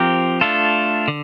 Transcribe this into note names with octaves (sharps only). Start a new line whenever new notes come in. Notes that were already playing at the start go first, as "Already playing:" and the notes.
Already playing: F3 C4 G4 A#4
A3 D4 F4 A4
D3